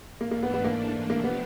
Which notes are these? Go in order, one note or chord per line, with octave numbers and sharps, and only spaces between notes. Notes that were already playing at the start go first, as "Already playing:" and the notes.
G#2 E3 A3 A#3 D4
A#3
B3
B3
A#3
C3 F3 A3 A#3 D4 G4
B3